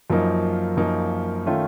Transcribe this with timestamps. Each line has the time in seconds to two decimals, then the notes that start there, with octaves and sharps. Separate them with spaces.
0.10 F#2 F3 A#3 D#4
0.77 F#2 F3 A#3 D#4
1.46 D#3 A3 C#4 F4